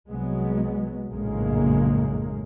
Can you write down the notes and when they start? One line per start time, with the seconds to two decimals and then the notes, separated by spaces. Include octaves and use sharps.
0.11 C2 F#3 G#3 B3
1.10 A#1 F#2 A2 C#3 G#3 A#3